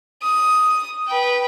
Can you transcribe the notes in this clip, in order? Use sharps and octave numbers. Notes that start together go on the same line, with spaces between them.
D#6
B4 G5